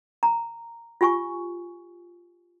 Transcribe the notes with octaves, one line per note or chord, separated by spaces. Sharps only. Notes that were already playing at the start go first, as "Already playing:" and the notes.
A#5
F4 G4 G#5 C#6